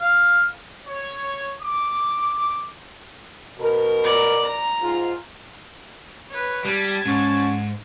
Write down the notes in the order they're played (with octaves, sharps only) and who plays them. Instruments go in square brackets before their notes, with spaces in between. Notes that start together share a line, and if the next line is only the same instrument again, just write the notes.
[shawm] F5
[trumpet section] C#5
D6
[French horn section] B2 A#4
[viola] D5 A#5
A#5
[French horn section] G#2 F4
[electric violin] B4 C#5
[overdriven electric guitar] G3 [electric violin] A5 G#6
[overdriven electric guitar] G#2 [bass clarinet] C#4